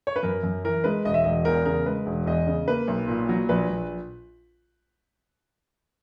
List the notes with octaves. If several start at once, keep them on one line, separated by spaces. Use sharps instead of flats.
C#5
B4
F#2 A#4
F#2
E3 A#4
G#3 B4
E1 D#5
E5
E1 D#5
E2 A#4
C#3 A#4
G#3 B4
E1
E2 D#5
C#3
A#3 B4
B1
A#2
F#3
A#1 B4
A#1